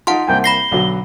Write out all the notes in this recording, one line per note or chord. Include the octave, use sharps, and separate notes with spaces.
D#4 F4 F#5 A5 C6
C2 A#3 G5 G#5
B5 A#6 C7 G7
B1 D3 F#3